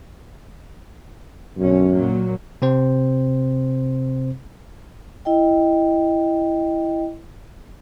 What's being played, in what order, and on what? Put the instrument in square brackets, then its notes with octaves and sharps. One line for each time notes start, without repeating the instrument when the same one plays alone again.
[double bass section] B1 D3 C#4 [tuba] F#2
[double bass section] A#2 F#3 A#3
[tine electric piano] C3 C4 C5
[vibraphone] E4 D#5 G5